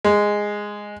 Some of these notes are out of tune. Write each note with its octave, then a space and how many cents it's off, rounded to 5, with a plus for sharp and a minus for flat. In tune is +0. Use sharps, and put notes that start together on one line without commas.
G#3 -5